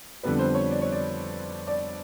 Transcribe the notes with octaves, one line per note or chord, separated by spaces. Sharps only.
F2 D3 G3 B3 B4
C5
C#5
D5
C#5
D5
D5